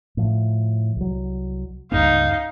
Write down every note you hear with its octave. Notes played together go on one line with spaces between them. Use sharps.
A2 F3
C2 F#3
C#2 G2 A#3 D#4 F5